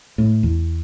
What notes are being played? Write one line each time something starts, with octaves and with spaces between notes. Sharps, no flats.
A2
E2